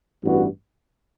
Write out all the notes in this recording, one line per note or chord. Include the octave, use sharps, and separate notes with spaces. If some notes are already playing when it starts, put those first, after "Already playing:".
A1 G2 E3 B3 F#4